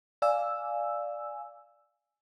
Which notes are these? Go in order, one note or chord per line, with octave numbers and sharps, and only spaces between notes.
D5 F5 G#5 E6